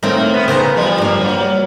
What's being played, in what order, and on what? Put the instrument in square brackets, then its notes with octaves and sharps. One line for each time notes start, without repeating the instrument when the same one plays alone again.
[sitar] A2 A#3 [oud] D#3 A3 C4
[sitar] B3
[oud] C#3 B3 A#4 [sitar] C5
[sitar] F3 G3
[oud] G2 A#3
[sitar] F#3